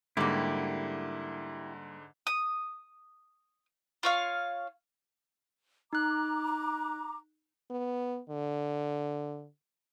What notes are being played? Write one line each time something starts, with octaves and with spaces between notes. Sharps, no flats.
G#2 D3 G3 A#3 E4 G4
D#6
F4 C#5 F5
D#4 A#5 D6 F#6
B3
D3